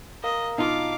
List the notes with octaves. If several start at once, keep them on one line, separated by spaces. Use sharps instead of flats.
A#4 D#5 F5 A#5
B2 D#4 F4 F5 A5 D6